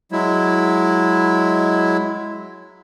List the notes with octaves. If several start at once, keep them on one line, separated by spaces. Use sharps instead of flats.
F#3 G#3 E4